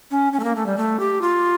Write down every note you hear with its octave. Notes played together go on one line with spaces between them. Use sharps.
C#4
C#4
A3
A#3
A3
G3
A3
G4
F4